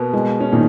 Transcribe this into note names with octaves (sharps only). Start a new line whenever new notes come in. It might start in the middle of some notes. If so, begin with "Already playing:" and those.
Already playing: B2 A#3 B3
G#3
C#4
A#2 D#3 D#4